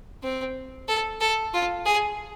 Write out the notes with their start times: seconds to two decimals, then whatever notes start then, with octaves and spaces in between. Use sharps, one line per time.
0.23 C4
0.88 A4
1.21 A4
1.53 F4
1.86 G#4